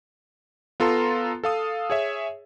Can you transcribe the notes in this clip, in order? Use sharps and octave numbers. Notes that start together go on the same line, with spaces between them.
B3 F4 A4 A#5 C6
A4 F5 D#6
G#4 C#5 E5